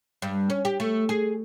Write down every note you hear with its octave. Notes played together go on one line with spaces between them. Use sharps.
G2
C#4
G4
A3
G#4